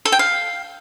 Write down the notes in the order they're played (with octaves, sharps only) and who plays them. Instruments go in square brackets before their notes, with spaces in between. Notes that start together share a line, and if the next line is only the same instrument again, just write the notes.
[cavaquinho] A4
G5
F5